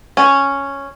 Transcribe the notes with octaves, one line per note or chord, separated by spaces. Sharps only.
C#4